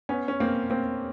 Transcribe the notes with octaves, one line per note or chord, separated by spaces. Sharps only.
B3 C#4
C#4
A#3 C4
A#3 C4